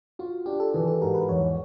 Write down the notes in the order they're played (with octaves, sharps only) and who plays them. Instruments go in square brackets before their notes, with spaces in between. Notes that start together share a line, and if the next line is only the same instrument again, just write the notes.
[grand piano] F4 [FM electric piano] F#4
[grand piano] D4 [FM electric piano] G4
[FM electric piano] A4
[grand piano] E3 [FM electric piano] G#4
[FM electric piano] A4
[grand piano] G#2 [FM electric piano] A#4
[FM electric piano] B4
[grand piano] E2 [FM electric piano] C#5